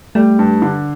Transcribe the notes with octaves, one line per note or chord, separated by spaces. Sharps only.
G3 A3
G2
D3